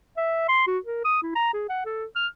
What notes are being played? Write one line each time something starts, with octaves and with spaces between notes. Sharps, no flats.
E5
C6
F#4
A#4
D#6
E4
A#5
G#4
F#5
A4
F6